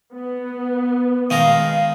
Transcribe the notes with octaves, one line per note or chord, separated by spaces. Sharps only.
B3
D#3 G#3 F5 A#5